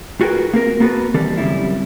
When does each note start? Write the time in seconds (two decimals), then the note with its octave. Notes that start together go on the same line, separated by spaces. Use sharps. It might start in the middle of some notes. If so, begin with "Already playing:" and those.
0.21 F4 F#4 G#4 A#4 B4 G5
0.53 A#3 C4 A#4
0.80 A#3 B3 F#4 G4 A4 B4
1.14 D#3 E3 G3 C4 A4
1.37 F#2 C#3 G3 C4 E4